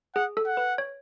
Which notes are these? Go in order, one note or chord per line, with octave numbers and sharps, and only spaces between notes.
G#4 F#5
A4
F#5
B4
C#5